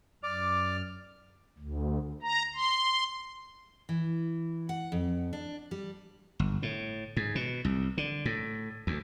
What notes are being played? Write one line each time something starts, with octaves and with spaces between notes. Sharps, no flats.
F#2 D5 D6 F6
D2
A#5
C6
E3
F#5
F2
D4
G3
G1
A2
G#2
B2
C2
D3
A2
D2